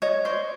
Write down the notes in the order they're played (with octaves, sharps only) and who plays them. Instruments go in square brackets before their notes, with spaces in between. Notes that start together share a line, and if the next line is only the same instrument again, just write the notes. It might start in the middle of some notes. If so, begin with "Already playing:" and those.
[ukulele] C#5 D#5 [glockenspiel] G#6
[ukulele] C5 D5 [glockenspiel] C#6